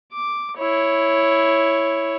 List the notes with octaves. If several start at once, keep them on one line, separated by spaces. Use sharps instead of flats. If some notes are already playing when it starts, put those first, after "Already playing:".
D6
E4 C#5